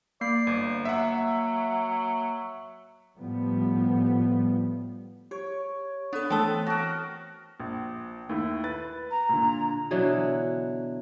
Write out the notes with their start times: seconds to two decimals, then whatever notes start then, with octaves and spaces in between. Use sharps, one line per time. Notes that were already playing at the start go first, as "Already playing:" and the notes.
0.21 A#3 D5 C7
0.47 G1
0.85 F#3 E5 F#5
3.18 A2 F3 G3 B3
5.31 G4 C#5
6.13 B3 D4 A4
6.30 E3 A3 C4 A4 D#6
6.66 F#4 A#4
7.60 A#1
8.29 D#2 A3 E4
8.64 B4 A6
9.11 A#5
9.29 A#2 D3
9.91 B2 D3 E3 F#3